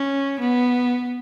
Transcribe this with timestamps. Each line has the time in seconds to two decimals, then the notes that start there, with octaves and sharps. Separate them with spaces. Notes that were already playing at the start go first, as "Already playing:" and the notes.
Already playing: C#4
0.40 B3